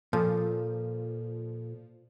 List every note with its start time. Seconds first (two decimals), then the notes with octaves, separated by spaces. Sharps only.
0.13 A#2 F3 A4